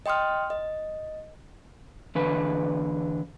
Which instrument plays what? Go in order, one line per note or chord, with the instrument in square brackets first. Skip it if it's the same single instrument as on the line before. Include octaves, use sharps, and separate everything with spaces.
[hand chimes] D#5 G5 C6 D#6 F6
D#5
[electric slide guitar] E2 D3 B4